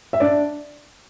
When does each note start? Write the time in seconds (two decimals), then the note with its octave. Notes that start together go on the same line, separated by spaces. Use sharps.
0.13 E5
0.20 D4 D5